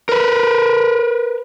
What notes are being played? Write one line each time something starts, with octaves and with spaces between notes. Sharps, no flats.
A#4 B4